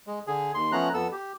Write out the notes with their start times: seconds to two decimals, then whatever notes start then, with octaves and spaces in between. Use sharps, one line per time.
0.07 G#3
0.27 D3 G#4
0.55 D#2 C6
0.72 F3 A3 B3 C#4 A#5 F#6
0.94 F2 B3 A4 E6
1.12 G4